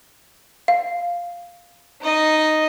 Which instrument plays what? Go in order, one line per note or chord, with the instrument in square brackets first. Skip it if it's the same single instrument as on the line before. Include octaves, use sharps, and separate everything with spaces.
[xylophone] F5
[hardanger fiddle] D#4 D#5